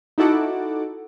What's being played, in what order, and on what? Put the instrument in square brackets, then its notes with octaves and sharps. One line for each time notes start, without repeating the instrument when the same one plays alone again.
[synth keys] D#4 E4 F#4 A4 F#5 D6